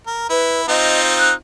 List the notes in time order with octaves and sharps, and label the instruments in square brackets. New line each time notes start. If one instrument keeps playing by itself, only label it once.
[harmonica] A#4
[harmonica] E4 [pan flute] B4
[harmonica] C4 D#4 F4 [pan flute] D#5
[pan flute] F#6